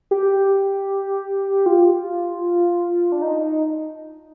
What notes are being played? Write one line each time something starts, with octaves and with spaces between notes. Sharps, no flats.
G4
F4
D4
D#4